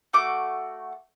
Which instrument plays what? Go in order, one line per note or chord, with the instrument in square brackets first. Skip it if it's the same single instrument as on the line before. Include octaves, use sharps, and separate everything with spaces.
[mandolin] A3 F#4 D6